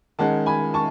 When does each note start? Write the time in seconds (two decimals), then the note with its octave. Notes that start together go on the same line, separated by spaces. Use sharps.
0.19 D#3 G#3 C#4 F#5 A5
0.46 G#5 B5
0.74 A5 C#6